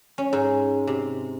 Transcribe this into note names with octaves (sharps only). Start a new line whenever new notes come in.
C#4
G#2
C3